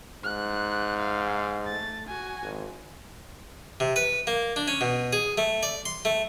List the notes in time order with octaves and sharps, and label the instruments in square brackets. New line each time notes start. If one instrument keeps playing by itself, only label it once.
[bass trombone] G#2 [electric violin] F#6
[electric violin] F5
A3 A6
F#4 G#5
[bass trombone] G#1
[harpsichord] C3
B4
A#3
D4
C#4
B2
G#4
A3
D5
C6
A3